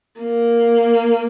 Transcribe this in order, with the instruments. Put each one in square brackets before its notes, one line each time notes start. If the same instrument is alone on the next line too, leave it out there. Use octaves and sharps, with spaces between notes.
[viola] A#3